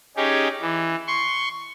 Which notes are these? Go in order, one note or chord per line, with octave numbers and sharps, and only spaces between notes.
C#4 D#4 G4 G#4
E3
C6 C#6